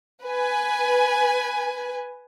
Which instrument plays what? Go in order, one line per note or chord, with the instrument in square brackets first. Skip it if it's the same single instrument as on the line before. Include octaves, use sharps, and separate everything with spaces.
[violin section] B4 G#5